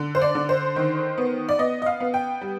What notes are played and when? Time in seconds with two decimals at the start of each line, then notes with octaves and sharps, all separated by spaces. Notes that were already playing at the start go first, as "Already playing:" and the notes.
Already playing: D3
0.15 C5
0.22 D5
0.35 D3
0.49 C5
0.76 D#3
1.18 B3
1.49 D5
1.59 B3 D#5
1.82 D#5
1.86 F5
2.00 B3
2.14 G5
2.41 G3